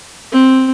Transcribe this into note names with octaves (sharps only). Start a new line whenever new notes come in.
C4